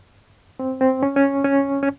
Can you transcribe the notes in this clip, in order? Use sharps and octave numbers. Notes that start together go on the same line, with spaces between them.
C4
C4
C#4
C#4
C#4
C#4